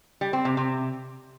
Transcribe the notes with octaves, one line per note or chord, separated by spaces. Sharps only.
G3
C4
C3
C3